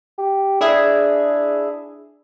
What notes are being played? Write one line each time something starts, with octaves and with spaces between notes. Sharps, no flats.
G4
D4 E4 G#4 E5